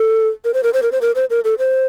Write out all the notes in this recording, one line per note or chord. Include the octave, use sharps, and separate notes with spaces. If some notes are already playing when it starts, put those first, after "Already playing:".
Already playing: A4
A#4
C5
A#4
C5
A#4
C5
A#4
C5
A#4
A4
C5